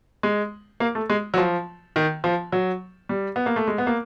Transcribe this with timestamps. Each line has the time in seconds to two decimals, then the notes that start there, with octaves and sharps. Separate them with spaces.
0.23 G#3
0.80 A#3
0.95 A3
1.10 G#3
1.34 F#3
1.38 F3
1.96 D#3
2.24 F3
2.52 F#3
3.09 G3
3.36 B3
3.46 A#3
3.56 A3
3.68 G#3
3.78 B3
3.87 A#3